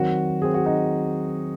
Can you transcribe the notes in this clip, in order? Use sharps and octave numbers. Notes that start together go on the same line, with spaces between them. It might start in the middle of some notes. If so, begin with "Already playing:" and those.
Already playing: D#3 F#3 C4 F#4
D#3 F#3 C4 G#4
F#4
D#4